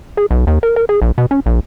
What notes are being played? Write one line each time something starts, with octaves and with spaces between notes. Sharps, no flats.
G#4
B1
D#2
A#4
A#4
G#4
A#1
B2
C#4
A#1